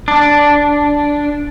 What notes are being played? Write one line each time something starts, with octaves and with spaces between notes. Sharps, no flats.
D4